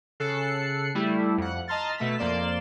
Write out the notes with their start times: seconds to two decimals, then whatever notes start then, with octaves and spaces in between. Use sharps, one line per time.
0.20 C#3 A4 F#6 C7 C#7
0.95 G3 A3 E4
1.37 F2 F#5
1.68 D#5 A5 A#5 C6 F6 A6
1.98 B2 A3 A5 B6
2.18 F2 A#3 D5 C6 E7